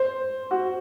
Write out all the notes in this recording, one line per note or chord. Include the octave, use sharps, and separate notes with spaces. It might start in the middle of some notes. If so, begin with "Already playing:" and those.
Already playing: C5
F#4